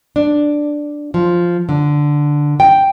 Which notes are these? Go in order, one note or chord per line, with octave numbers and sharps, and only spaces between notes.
D4
F3
D3
G5